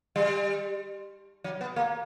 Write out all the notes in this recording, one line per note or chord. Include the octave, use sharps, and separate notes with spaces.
G3
F#3
B3
A#3